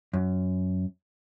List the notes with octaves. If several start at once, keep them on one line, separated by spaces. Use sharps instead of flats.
F#2